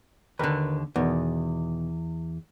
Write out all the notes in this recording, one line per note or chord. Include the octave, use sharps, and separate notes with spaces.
D#2 D3 A#4 B4
E2 B2 D#3 B3